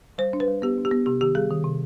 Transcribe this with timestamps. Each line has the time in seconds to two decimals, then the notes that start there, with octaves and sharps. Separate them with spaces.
0.18 G3 C5
0.33 D4
0.40 B4
0.48 G3
0.62 B3 G4
0.78 D4
0.85 G4
0.91 B3
1.06 C3 G4
1.21 D#3 G4
1.35 G3 G#4
1.51 D#3
1.64 C3